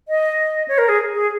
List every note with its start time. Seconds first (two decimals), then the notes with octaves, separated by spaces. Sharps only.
0.08 D#5
0.68 C#5
0.78 A#4
0.89 G#4
1.13 G#4